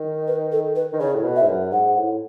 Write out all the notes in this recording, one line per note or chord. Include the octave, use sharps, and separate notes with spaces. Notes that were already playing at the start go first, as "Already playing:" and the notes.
Already playing: D#3
B4
A4
B4
D#3
C#3 C#5
A2
B2
E5
G#2
F#2
G#2 F#5
A2